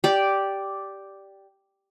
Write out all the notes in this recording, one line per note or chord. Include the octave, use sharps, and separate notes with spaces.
G4 D5